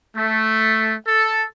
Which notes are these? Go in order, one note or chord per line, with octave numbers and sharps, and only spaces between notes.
A3
A4